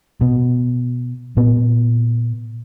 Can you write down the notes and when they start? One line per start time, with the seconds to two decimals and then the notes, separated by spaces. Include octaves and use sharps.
0.21 B2
1.37 A#2 B3